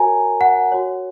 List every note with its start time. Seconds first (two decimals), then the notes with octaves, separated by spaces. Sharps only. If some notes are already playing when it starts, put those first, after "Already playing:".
Already playing: F#4 A#4 C#5 G#5 A#5
0.41 F#5
0.72 F#4 C#5